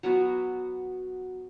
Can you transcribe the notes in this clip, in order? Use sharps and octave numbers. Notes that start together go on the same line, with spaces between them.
F#3 B3 F#4